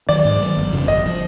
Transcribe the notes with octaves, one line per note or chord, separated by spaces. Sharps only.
D#3 F#3 D5
G#2
D#3 F#3
G1
F2 C#3 F3
G1 D#5
C#3 F3